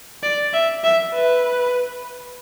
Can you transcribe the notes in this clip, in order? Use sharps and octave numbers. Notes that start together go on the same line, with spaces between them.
D5
E5
E5
B4